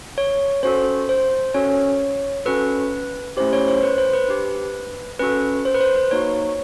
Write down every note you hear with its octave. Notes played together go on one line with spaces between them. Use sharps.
C#5
C#4 F#4 A4 C5
C5
C#4 F#4 A4 C#5
C#4 F#4 A4 B4
A3 C#4 E4 G4 C5
C#5
C5
B4
C5
B4
D4 G4
C#4 F#4 A4 B4
C5
B4
C5
B4
A#3 D#4 F#4 C#5